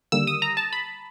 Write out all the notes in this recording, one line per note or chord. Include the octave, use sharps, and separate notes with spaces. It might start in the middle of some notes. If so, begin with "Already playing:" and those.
D#2 D3 G3 A#3 E6
D#6
A#5
A5
B5